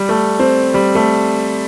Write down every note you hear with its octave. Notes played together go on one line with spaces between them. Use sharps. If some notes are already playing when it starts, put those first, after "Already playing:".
Already playing: G3
A3
C4
G3
A3